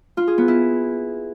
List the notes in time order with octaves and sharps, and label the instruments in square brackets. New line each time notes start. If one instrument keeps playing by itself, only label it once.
[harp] F4
G#4
B3
E4